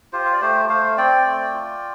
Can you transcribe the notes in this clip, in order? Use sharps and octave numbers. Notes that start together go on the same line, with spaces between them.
F4 G4 C5
F5
D5
A3 G4 C5
A3 C5 F5
C4 D5 G5
A3
F4